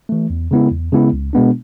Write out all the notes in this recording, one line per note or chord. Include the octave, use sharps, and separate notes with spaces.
E3 A3
E2
C#3 G#3 B3 E4
E2
C#3 G#3 B3 E4
C#2
B2 G#3 B3 D4